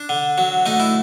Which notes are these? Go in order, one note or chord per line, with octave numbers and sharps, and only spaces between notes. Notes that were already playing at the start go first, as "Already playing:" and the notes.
Already playing: D4
D3
F#3
A3 D#4
E4